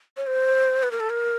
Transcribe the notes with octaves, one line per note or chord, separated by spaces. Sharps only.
C#5
C5
B4
A#4
A4
A#4